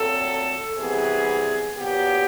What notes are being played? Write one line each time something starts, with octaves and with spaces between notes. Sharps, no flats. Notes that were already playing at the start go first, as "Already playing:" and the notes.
Already playing: A#2 F#3 A3 C4 A4
C3 E3 G3 B3 G#4
A#2 F#3 B3 G4